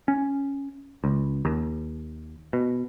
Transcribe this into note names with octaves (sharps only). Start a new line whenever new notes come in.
C#4
C#2
D#2
B2